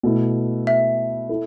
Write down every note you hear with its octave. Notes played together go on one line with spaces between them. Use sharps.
B2 A3 E4
E5
E4 A4